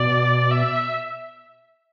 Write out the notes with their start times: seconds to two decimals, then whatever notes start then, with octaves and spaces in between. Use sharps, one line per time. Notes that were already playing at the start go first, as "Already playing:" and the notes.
Already playing: B2 D5
0.51 E5